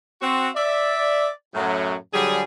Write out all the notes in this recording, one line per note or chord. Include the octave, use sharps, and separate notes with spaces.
C4 F#4
D5 E5
F#2 A2 F#3
D3 F#3 G3 G#4